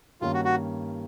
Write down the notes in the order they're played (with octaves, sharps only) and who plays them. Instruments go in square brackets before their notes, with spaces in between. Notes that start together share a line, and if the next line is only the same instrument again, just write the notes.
[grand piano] G2 D#3 G3 A#3 C#4 [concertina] F4
[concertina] F#4
F#4